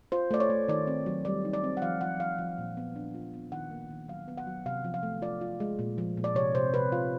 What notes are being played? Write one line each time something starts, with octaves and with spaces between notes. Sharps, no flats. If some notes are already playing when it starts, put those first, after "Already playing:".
F4 C5
A3 D5
C#5
A3
D#3 D5
C4
F#3
G3 D5
D#4
D5
C4
F#5
F3 F5
F3 F#5
F3 F5
F3
A#2
B3
D4
F4
B3
D#3 F#5
A#3
D#3
F#3 F5
B3
F#5
F#3
C3 F5
F3
F5
A3
F4 D5
F4
G#3
A#2
F3
A#2
D5
C3 C#5
C3 C5
C3 B4
F4